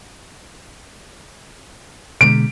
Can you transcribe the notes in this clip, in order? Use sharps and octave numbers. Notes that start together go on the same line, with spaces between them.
B2 D3 G#3 D7